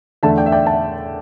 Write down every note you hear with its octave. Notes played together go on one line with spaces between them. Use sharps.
E2 D3 A3 E5 A5
D5 G5
E5
D5 G5
E5 A5